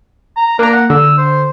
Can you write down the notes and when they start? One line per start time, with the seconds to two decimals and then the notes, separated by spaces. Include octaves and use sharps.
0.36 A#5
0.59 A#3 D4 A#5
0.73 F#5
0.90 D3 E6
1.18 C5